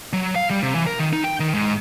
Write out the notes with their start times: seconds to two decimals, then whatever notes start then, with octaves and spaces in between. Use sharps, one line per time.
0.13 F#3
0.35 F5
0.50 G3
0.63 C3
0.75 E3
0.87 A#4
0.99 D#3
1.13 D#4
1.24 G5
1.40 D#3
1.54 G#2